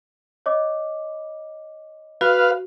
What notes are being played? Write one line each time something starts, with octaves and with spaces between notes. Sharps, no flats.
C#5 D#5 D6
F#4 B4 F5